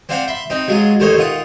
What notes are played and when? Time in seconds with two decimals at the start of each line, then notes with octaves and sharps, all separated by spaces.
0.09 C4 D4 C5 F5 F#5
0.28 E5 B5 C6
0.50 C4 D#4
0.68 F#3 G#3 F4 G#4
1.00 A1 D#2 A3 D#4 C5 C#5
1.18 D#3 F4 F#5 D#6